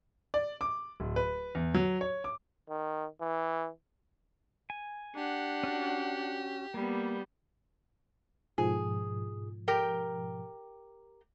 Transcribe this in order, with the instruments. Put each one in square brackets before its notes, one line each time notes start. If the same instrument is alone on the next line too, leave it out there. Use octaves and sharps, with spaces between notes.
[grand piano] D5
D6
D1
B4
E2
F#3
C#5
D6
[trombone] D#3
E3
[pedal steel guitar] G#5
[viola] D4 F#5 [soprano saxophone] G4
[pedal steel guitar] C#4 F#4
[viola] G3 B3 [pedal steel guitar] A#3
[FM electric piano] G#2 B2 F3 [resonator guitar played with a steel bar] G#4
[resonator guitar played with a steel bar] G4 A#4 G5